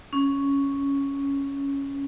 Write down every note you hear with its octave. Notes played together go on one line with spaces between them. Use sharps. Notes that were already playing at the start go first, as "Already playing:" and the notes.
C#4